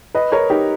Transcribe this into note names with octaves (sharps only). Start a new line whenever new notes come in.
B4 D#5
A#4 C#5
D#4 G4